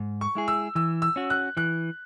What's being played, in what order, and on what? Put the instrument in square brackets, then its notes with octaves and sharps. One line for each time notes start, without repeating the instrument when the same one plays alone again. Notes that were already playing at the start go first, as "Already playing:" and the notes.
Already playing: [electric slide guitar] G#2
[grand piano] C#6
[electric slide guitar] G#3 E4 G#4
[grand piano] E6
[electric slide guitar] E3 [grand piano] E6
[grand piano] E6
[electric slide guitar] C#4 F#4
[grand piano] F#6
[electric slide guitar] E3 [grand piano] F#6